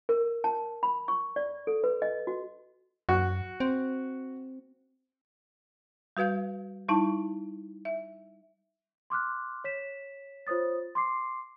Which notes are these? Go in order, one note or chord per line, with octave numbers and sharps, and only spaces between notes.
A#4
A5
B5
C#6
D5
A4
B4
D#5
F#4
F#2 F#4
C4
G3 F#4 B4 F5 G6
G3 D#4 E4 A5
E5
C6 D6 F6 F#6
C#5 B6 E7
F4 C5 C#5 D#6 A6
C6 D6 C7